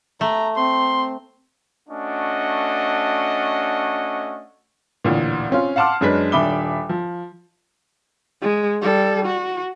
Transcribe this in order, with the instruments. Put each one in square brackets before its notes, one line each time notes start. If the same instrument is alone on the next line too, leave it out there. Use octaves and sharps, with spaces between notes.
[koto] A3 [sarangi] A#5
[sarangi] C4 [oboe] C6
[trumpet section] A3 C#4 D4 F#4 D#5
[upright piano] A1 D2 A#2
C4 C#4 F4
F5 F#5 A5 C6 D6 F6
F#2 G#3 D4 B4 B6
D#1 D4 E5 B5 D6 G7
F3
[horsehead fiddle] G#3
G3 A4
F#4